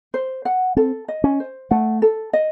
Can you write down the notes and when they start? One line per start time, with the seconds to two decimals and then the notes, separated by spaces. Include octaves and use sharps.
0.14 C5
0.45 F#5
0.76 C4 A4
1.08 D#5
1.24 C#4
1.40 C5
1.71 A3 F#5
2.02 A4
2.33 D#5